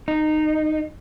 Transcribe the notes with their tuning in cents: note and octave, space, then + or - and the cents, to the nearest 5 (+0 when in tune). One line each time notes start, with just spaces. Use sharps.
D#4 -15